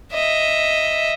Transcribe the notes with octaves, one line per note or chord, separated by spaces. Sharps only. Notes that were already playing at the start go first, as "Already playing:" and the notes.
D#5 E5